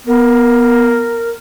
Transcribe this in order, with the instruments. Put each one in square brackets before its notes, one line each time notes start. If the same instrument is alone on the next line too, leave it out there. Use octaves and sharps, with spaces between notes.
[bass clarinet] B3 [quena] A#4